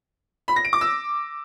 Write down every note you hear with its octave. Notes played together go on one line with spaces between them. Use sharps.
B5
A#6
D7
D6
E6